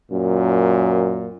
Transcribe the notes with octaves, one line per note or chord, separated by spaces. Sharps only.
F#2 A#2